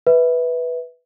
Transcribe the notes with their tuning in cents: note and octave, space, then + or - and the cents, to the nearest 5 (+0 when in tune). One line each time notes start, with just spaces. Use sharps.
B4 +0 E5 -20